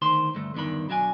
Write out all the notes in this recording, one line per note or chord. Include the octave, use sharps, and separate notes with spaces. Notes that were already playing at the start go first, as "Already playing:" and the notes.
D2 D#3 C5 C6
D2 G2 A3
E2 G2 D3 D#3 B5
B1 F#3 D4 F5 G#5